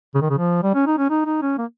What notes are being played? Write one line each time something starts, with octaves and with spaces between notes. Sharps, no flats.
C#3
D#3
C#3
F3
G3
C#4
D#4
C#4
D#4
D#4
C#4
A#3